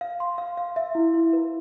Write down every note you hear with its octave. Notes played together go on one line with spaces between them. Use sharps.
F5
C6
F5
F5
E5
E4
E4
B4